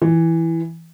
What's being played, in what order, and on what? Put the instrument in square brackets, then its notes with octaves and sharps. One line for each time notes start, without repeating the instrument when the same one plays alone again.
[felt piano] E3